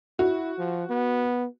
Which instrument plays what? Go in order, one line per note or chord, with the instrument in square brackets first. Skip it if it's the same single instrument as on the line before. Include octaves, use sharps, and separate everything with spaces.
[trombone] E4 [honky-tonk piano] F#4
[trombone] F3
B3